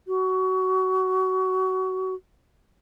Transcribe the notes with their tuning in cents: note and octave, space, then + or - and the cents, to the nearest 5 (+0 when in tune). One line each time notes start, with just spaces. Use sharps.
F#4 +20